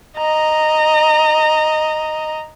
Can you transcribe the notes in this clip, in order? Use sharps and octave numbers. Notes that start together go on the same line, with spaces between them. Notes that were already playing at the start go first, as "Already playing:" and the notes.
D#5 A#5